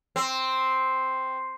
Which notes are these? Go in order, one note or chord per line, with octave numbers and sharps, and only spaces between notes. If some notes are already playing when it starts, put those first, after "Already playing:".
C4